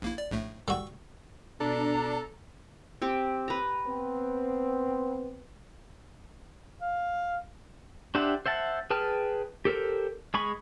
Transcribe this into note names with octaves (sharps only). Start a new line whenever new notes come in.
A#1 A#3 E4
D5
A#1 A2 A3
G3 F#4 C#6 E6
B2 D4 A4 A#5
C4 G4
B4 A#5
B3 C4
F5
D4 G4 C5 E5 F#5
C5 E5 F#5 A5
G#4 B4 G5 A5 F6
G4 A4 A#4 C5
G#3 G#4 B5 C#6